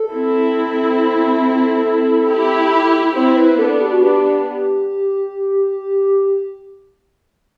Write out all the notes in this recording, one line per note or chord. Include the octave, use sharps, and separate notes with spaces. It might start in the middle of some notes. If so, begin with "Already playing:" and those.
Already playing: A4
C4 E4
E4 G4
C4 E4 C5
B4
B3 D4 A4
G4
F#4
B3 D4 G4